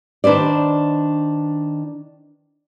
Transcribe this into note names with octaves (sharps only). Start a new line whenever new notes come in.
D#3 D4 B4 C5 D5